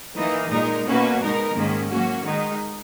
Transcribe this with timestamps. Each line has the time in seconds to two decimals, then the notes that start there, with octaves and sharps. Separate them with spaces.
0.16 E3 A#3 D#4
0.50 A#2 G#3 D#4 A#4
0.86 B2 A#3 C#4 F#4 B4
1.20 B2 G#3 D#4 A#4
1.55 G#2 D#3 A#3 C#4
1.89 F#3 A#3 C#4 F#4
2.24 D#3 G#3 D#4